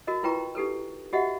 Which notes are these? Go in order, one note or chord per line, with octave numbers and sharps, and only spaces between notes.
F#4 A#4 D#5
E4 F4 B4 G5 A#5 C#6
D#4 G4 A4 B4
F#4 G4 D#5 E5 F#5